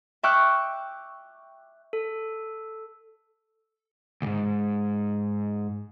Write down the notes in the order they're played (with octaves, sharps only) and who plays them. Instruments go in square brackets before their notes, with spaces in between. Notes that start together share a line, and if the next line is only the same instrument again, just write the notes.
[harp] E5 G5 C#6 D6 F6 F#6
[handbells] A4
[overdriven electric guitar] D2 G#2